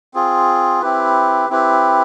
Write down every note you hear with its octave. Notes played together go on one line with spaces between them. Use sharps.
C4 F4 G#4
C4 E4 G4 B4
C4 E4 G4 B4